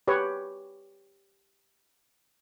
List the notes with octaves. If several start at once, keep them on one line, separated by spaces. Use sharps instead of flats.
G4 B4 C#5